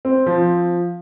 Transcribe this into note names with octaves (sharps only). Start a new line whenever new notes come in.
C4
F3